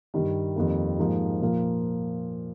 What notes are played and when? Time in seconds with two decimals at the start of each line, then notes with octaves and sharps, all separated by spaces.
0.14 G2 D#3 G3
0.56 F2 D#3 G3 A#3
0.98 G#2 F3 A#3 D#4 G4
1.42 A#2 F3 A#3 F4